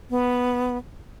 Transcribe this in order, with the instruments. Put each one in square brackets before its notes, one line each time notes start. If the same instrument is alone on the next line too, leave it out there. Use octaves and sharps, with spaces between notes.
[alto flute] B3